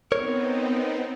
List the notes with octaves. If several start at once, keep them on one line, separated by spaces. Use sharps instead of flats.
B3 C4 D#4 A#4 C#5